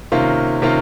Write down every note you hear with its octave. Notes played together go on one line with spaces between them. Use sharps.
C3 D#3 A#3 C#4 F4
C3 D#3 A#3 C#4 F4